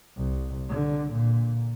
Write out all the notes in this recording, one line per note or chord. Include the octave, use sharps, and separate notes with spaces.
C2
D3
A#2